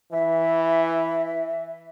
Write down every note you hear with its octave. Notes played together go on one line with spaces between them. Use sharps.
E3 E5